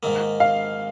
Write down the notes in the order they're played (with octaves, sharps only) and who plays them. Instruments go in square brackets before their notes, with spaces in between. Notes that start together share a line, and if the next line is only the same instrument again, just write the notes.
[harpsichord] G#2 D#3 A#3
[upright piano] F5